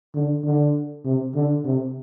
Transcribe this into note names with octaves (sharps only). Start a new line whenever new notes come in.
D3
D3
C3
D3
C3